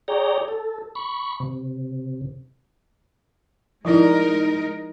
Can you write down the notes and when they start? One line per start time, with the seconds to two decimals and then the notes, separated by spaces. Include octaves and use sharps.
0.08 G#4 C#5 D5 G5 A#5
0.48 A4
0.95 B5 C#6
1.40 C3
3.85 F3 G#3 D#4 E4 A#4 D5